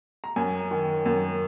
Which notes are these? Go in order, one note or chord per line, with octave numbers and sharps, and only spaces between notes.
A#5
F#2 G#5
D#3
F#2